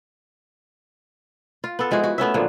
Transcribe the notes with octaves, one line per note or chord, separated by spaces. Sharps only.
F4
B3 A4
F3 G#3 E4 F#4
F#4
A3 B3 C#4 E5
A#2 D3 F3 F#3